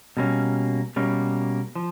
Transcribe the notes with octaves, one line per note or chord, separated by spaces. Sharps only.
B2 G3 A#3 C#4
B2 G3 A#3 C#4
F3